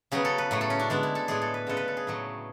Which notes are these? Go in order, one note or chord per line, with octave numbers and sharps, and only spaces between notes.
C#3 F#3 B3 G#4
A4
B4
A2 F#3 A3
A4
C#4
D4
D3 G#3 B3 D4
E4
A4
A2 G#3 B3 G#4
A4
B4
C#3 G#3 B3 A4
B4
A4
G#4
A2 F#3 A3